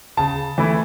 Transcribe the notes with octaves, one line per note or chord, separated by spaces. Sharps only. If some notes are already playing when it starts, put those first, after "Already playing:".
C#3 A5
E3 A3 E4